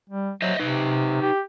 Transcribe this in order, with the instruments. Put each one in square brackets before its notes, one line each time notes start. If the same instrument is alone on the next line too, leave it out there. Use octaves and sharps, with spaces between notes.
[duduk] G3
[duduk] F#3 [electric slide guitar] C5 D#5 E5
[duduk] C3 [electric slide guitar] D#4 B4
[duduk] G4